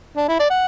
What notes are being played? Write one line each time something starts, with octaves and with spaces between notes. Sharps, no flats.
D4
E4
D5
F#5